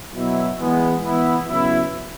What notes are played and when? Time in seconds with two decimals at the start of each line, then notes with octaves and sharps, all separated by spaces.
0.14 B2 F#3 E4
0.59 E3 G#3 B3
1.03 E3 B3 E4
1.47 C#3 F#3 B3 E4